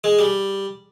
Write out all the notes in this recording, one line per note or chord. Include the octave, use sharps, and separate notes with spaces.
G#3
G3